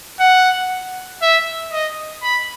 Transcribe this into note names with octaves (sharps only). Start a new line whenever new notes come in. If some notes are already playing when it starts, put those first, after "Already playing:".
F#5
E5
D#5
B5